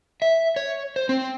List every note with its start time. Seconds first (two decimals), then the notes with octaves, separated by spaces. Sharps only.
0.22 E5
0.56 C#5
0.96 C5
1.09 C4